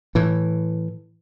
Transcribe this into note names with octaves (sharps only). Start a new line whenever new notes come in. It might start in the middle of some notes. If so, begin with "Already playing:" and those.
A2 E3